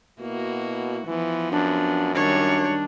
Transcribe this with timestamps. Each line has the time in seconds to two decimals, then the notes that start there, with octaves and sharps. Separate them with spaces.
0.21 B2 A#3 E4 F#4
1.07 E3 F3 B3
1.52 F#2 D4
2.15 D#3 G3 D4 C#5